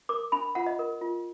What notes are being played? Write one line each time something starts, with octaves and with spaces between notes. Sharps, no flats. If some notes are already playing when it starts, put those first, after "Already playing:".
A#4 D6
D4 B5
F4 F#5
D#5
A#4
F4